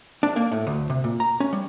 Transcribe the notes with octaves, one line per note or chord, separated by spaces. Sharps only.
D4
A#3
A2
D2
C3
A#2
A#5
C#4
G3